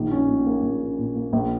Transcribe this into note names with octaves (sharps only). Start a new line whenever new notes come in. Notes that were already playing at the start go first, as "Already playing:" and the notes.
Already playing: A#1 D#3
C#4
A#2
A#3
A#1
C#4
A#2
A#3
A#1